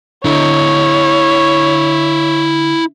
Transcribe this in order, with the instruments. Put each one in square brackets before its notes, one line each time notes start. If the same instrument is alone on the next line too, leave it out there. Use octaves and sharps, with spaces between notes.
[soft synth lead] D3 [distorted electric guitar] E4 D#5 [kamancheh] C#5